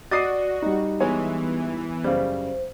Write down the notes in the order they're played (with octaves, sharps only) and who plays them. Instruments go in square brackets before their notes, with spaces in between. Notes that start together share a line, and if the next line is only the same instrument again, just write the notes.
[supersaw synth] F#4 [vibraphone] D5 [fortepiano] D#5 D6 D#6 [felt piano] A6 C7 D#7
[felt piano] G3 D#4
[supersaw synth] E3 [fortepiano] G#3 C#5 G#5 [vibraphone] B3
[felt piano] F#2 [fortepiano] C#3 G3 [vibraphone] C5